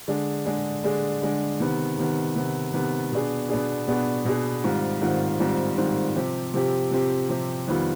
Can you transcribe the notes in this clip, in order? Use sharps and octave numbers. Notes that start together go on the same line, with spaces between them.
D3 G#3 D4 G#4
D3 G#3 D4 G#4
D3 G#3 D4 G#4
D3 G#3 D4 G#4
C3 D#3 B3
C3 D#3 B3
C3 D#3 B3
C3 D#3 B3
B2 B3 D4 G#4
B2 B3 D4 G#4
B2 B3 D4 G#4
B2 B3 D4 G#4
G#2 D#3 G3 C4 F4
G#2 D#3 G3 C4 F4
G#2 D#3 G3 C4 F4
G#2 D#3 G3 C4 F4
C3 F3 C4 G4
C3 F3 C4 G4
C3 F3 C4 G4
C3 F3 C4 G4
F2 D#3 G3 B3 F4